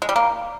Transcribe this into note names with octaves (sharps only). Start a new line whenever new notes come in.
G#3
G3
A#3